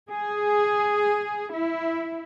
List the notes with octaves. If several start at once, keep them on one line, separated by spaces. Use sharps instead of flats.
G#4
E4